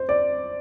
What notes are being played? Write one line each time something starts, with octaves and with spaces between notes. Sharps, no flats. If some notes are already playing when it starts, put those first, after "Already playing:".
Already playing: C5
D5